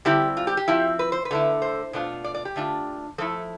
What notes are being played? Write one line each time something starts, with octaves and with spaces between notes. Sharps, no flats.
D3 G3 C4 E4 G4
F4
G4
G4
F3 C4 E4
B4
C5
B4
D3 A3 E4
C5
B2 A3 D4 F4
D5
D5
G4
D3 A3 D4 F4
F3 A3 E4 A4